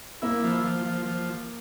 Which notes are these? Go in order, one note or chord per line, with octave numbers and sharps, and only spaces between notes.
A#3 E4
F3
F3
F3
F3